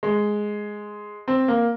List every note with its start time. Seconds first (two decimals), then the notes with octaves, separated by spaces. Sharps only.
0.03 G#3
1.28 C4
1.48 A#3